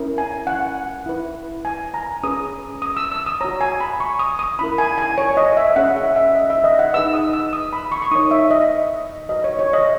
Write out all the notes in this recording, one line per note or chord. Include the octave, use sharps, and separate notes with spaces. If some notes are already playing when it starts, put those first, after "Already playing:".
Already playing: C#4 E4 A#4
G#5
F#5
E4 B4
G#5
A#5
C#4 G#4 B4 D#6
D#6
E6
E6
D#6
F#4 C#5 A#5
G#5
B5
C#6
D#6
D#6
C#4 E4 A#4 B5
G#5
G#5
C#5
D#5
E5
C#4 G#4 C#5 F#5
E5
E5
D#5
E5
D#5
F#5
D#4 G#4 B4 E6
D#6
E6
D#6
B5
C#6
C#6
D#4 A#4 C#5 D#6
E5
D#5
F#4 B4 D#5
C#5
C#5
D#5